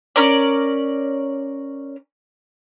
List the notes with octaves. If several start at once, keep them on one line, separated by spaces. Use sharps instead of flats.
C#4 A#4 D5